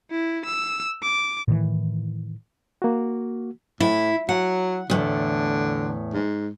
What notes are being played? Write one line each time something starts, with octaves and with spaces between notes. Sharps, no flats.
E4
E6
D6
A2 D#3 E3
A#3 F#4
A2 E4
F#3 F#5
E2 A2 D3
G#2